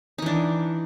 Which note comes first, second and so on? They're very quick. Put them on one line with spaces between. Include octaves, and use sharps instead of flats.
D#4 E3 D4